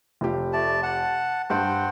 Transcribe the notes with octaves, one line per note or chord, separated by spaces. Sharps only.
F1 F4 G4
A3 D5 A5
F#5 A5
G2 C5 F#5 G5 A5 F#6